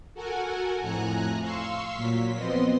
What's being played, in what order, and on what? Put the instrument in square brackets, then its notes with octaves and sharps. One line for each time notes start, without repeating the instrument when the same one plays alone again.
[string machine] F#4 A4 A#4 F#5 G#5
F2 A2 G#5 A#5 F#6
F5 C6 C#6 E6
A#2 F#3 B6
F2 B3 C4 D#5 C6